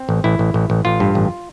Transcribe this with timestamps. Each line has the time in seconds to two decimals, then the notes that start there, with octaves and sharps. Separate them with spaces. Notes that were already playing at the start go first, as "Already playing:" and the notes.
Already playing: C4
0.09 A1
0.24 A1 E4
0.39 A1
0.54 A1
0.70 A1
0.85 A1 F4
1.00 G2
1.15 A1